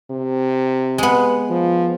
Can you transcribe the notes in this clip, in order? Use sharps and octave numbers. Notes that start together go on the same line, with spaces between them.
C3
G#3 B3
F3